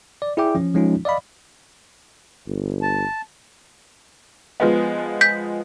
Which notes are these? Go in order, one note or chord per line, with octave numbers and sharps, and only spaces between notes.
D5
E4 G#4 D5 E5 G5 D6
F3 C#4
F3 G#3 C#4 D#4 F4
D5 D#5 F5 B5
G1
A5
F3 G#3 B3
G6 B6